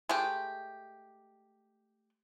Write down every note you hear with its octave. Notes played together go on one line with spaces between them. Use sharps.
G#3 A3 G4